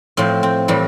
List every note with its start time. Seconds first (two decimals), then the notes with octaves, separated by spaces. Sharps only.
0.17 A2 F3 C4
0.43 C4
0.68 A2 E3 G3